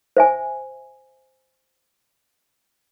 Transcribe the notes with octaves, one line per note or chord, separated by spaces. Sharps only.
C5 E5 G#5